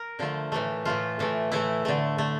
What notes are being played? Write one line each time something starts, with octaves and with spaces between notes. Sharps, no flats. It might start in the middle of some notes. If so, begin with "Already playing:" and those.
Already playing: A#4
D3 F3 A3
A2 E3 A3
A2 E3 A3 F4
A2 E3 A3
A2 E3 A3 E4
D3 A3
D3 A3